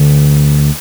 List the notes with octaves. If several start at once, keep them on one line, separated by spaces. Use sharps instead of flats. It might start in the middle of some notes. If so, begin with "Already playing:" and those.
Already playing: D2 D3